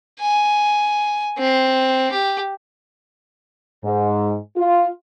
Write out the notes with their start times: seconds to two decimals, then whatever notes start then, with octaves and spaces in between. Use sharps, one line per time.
0.20 G#5
1.38 C4
2.12 G4
3.83 G#2
4.57 F4